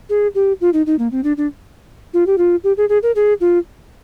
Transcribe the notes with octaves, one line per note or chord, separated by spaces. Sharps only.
G#4
G4
F4
D#4
D#4
A#3
C4
D4
D4
F4
G4
F4
G4
G#4
G#4
A#4
G#4
F4